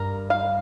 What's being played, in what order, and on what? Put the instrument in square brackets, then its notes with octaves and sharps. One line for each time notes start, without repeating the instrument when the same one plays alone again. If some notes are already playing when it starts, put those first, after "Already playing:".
Already playing: [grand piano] G2 [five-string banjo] A#4
[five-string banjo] F5